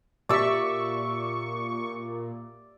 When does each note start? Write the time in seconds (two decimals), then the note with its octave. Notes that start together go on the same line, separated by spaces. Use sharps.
0.29 A#2 G4 D5 E5 C#6 E6 B6